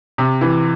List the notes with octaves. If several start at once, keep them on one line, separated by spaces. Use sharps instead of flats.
C3
E3